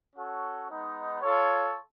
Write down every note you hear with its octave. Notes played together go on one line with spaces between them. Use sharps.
C#4 F#4 A4 C#5
G#3 B3 D#4
F4 A4 C#5